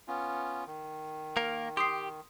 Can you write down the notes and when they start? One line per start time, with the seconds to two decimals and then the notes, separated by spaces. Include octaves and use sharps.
0.08 B3 C#4 F4
0.67 D#3
1.37 A#3 A#4
1.77 G4 C6 D#6 C7